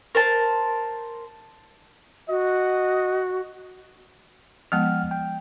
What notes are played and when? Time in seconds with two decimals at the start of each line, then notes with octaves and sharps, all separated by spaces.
0.15 A#4 C5 A5
2.29 F#4 D#5
4.72 F3 G#3 B3 F#5 G5 F6
5.11 G5